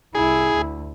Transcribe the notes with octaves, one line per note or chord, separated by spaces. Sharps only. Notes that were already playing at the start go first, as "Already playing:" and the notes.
C2 E4 G#4
D2